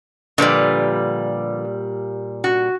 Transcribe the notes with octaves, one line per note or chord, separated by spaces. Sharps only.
A#2 D3 F3 G3 B4
F#4